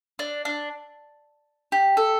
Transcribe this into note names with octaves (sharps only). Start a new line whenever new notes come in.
D4
D4
G4
A4